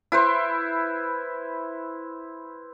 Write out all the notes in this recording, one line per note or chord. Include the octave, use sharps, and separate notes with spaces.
E4 B4 C5